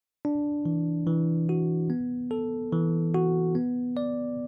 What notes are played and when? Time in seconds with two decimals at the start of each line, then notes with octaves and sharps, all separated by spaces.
0.25 D4
0.66 E3
1.07 E3
1.49 F#4
1.90 B3
2.31 A4
2.72 E3
3.14 F#4
3.55 B3
3.97 D5